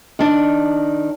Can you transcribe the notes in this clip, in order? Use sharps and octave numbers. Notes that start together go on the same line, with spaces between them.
D#3 D4